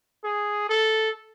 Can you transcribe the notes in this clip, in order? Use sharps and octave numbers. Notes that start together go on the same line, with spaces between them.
G#4
A4